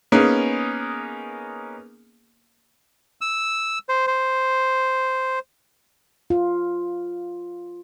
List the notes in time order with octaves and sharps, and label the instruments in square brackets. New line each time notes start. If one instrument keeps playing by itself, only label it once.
[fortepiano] A#3 B3 C#4 D#4 G#4
[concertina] E6
C5
C5
[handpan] F4